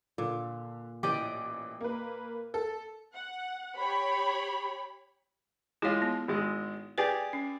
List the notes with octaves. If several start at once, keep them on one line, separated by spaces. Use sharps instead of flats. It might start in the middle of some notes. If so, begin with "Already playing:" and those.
A#2 D3
A1 E3 G4 D5 D#5
A#3 B4
A4
F#5
G4 C#5 B5
G#3 E4 F4 C#5
B3
G#1 G#3
G4 G#4 B4 D5
C#4